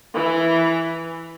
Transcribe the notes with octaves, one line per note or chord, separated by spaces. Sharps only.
E3